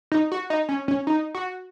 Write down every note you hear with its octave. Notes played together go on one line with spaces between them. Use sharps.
D#4
F#4
D#4
C#4
C#4
D#4
F#4